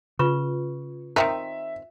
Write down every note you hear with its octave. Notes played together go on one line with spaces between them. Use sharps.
C#3 F4 B4 C#6
D#3 C4 D#4 E5